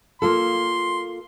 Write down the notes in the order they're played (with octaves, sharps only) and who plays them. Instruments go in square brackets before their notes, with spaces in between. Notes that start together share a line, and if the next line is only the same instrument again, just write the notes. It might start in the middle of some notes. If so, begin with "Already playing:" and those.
[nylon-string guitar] A#3 F4 A4 [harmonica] C6